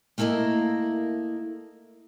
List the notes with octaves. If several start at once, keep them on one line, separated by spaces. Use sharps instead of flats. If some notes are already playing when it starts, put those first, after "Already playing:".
A3 A#3 E4 A#4 D#5